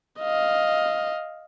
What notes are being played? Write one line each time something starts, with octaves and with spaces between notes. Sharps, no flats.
D#5 F5